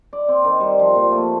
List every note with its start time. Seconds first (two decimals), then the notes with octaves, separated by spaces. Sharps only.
0.13 D5
0.28 C4
0.44 D#3
0.60 G3
0.79 F3
0.95 A#2
1.11 A3